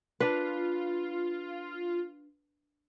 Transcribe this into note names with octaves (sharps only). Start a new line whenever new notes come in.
D4 F4 B4